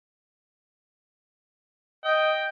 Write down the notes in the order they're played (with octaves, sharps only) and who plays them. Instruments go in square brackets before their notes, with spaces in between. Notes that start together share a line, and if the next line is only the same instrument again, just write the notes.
[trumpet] D#5 [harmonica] G5